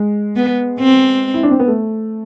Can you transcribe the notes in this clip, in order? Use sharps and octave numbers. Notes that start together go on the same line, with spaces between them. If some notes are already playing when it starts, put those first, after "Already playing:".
Already playing: G#3
B3
C4
E4
D4
C4
B3
A3